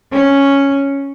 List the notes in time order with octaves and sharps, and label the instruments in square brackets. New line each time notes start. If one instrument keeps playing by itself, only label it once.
[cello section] C#4